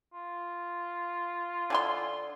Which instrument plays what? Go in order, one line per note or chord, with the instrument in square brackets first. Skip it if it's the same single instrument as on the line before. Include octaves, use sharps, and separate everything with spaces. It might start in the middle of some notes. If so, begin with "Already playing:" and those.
[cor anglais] F4
[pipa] D3 G#5 C6